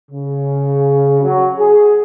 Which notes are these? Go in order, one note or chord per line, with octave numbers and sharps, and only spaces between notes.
C#3
F#3
G#4